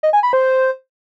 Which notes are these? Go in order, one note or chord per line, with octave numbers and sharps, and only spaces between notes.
D#5
G#5
B5
C5